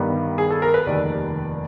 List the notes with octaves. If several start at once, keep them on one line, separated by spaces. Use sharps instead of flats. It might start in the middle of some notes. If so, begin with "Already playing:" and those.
Already playing: G2 D#3 G3 B3
G#4
A4
A#4
B4
F1 D#2 D#3 G3 D5